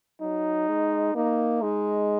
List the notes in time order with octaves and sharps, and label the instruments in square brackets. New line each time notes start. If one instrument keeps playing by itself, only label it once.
[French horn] F#3 [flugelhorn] D#4
[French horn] G#3
[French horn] A#3 [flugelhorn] D#4
[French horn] G#3 [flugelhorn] D#4